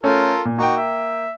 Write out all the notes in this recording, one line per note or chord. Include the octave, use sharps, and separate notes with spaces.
A3 C#4 F4 A4 A#4
A#2
A#3 D#4 F#4 G5
E5